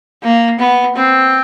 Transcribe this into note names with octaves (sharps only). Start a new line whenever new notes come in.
A#3
B3
C4